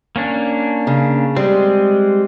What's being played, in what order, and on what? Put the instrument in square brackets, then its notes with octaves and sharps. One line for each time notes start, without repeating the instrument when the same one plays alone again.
[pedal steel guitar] A#3 C#4 D4
[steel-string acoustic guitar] C#3
[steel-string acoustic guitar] G3 [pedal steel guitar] G#3 C4